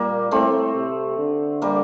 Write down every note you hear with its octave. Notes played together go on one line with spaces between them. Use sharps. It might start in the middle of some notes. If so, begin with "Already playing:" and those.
Already playing: A#2 G3 A#3
A2 A3 C4
C3
D3
G3 A#3